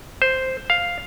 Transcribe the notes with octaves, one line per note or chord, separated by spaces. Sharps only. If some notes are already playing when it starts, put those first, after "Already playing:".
C5
F5